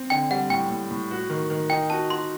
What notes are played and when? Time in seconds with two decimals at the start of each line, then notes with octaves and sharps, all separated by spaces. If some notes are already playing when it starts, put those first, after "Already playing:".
Already playing: C4
0.10 D3 G5
0.31 G3 F#5
0.50 A2 G5
0.70 A2
0.91 A2
1.11 F#4
1.30 D#3
1.50 D#3
1.70 D#4 G5
1.90 F#4 A5
2.10 F#4 C6